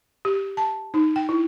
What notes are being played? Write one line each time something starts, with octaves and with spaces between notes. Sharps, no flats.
G4
A5
D#4
G5
E4